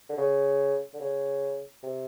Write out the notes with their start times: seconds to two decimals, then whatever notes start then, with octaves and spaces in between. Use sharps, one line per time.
0.09 D3
0.17 C#3
0.94 D3
1.00 C#3
1.83 C3